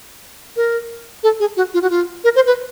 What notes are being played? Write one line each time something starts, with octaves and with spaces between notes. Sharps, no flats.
A#4
A4
G#4
F#4
F4
F#4
F4
A#4
C5
B4